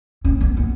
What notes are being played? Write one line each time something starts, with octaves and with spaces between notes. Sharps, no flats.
C#4
B3
B3